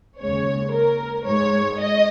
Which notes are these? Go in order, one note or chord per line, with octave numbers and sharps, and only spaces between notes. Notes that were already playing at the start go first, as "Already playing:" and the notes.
D#2 C#3 G#3 C#5
A#4
G#2 G#3 C#5
D#5